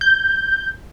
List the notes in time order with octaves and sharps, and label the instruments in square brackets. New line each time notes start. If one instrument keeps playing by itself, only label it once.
[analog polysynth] G6